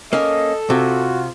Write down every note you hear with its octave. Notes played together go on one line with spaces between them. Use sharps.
A#3 C#4 A4 D#5
C3 F4 F#4